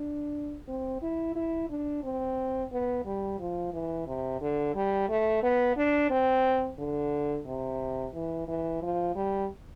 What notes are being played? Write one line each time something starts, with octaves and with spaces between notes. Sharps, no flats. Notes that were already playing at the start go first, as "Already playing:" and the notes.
Already playing: D4
C4
E4
E4
D4
C4
B3
G3
F3
E3
C3
D3
G3
A3
B3
D4
C4
D3
C3
E3
E3
F3
G3